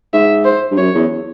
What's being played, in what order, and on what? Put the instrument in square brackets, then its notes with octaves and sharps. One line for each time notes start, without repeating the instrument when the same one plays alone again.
[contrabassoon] G#2 [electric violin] E5
[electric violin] C5
[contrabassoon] G2
[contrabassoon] F#2 [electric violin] C#5
[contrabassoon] E2